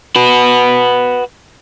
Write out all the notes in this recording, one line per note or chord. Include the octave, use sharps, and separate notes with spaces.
F#4 B4